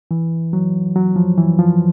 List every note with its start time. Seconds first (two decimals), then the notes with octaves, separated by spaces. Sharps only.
0.11 E3
0.53 F#3
0.96 F#3
1.16 F3
1.38 E3
1.59 F3